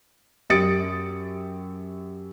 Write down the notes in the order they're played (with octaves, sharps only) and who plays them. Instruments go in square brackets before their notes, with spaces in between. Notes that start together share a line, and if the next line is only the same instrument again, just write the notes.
[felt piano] F#2 G4 D#6 A6 C#7 D7